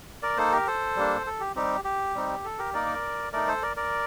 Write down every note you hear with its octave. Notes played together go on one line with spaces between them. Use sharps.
A#4 D5
A#3 D#4 A4 C5
G4 A#4
A4 C5
G3 A#3 D4
A4
G4
G3 C4 D#4 G4
G4
G3 C4 D#4
A4
G4 A#4
A#3 D#4 A#4 D5
A3 D#4 A#4 D5
A4 C5
A#4 D5
A#4 D5